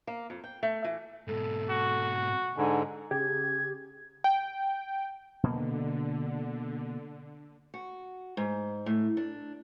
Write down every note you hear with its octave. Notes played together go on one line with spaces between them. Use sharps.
A#3
F2
G5
A3
E3
G#2 B2 A4
F#4
G#2 D3 G#5
C#3 G4 G#4 G#6
G5
B2 D3 A#3
F#4
G#2
A2
D4